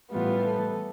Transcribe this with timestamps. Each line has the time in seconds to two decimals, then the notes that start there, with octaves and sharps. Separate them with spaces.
0.12 A2 E3 G3 B3 F4
0.44 A4